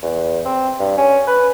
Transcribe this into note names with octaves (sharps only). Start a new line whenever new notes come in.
E2
C4
G2
C#4
B4